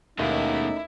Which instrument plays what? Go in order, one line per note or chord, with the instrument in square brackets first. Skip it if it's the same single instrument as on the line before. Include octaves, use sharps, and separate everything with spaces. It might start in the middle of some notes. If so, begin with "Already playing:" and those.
[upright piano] D#2 [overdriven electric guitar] B2 G#3 [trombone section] A3 C#4 D#4 [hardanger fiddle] E4